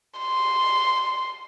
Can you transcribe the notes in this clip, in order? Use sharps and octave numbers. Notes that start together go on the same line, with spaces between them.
C6